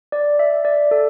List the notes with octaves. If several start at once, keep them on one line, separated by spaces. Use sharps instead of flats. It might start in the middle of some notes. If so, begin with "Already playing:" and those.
D5
E5
D5
A4